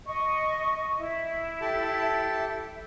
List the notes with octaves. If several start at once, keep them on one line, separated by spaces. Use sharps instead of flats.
D#5 C#6
E4 E5
G4 A4 A5